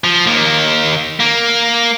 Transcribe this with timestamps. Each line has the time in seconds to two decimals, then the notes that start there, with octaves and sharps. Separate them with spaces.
0.04 F3
0.27 D#2 A#3
1.20 A#3